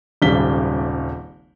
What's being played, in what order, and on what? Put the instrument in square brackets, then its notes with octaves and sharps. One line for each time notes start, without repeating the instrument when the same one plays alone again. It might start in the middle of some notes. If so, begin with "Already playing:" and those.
[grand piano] D#1 G#1 C#3 G3 B6 G7